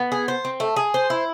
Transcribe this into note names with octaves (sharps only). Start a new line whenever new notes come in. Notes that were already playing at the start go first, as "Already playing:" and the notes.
Already playing: B3
G#4
C5
C4
A3
G#4
C5
E4